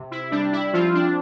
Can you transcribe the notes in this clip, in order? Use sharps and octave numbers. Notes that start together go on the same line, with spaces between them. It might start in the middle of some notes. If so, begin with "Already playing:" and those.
Already playing: C3
E4
G3 D4
E4
F3 C4 F4
D4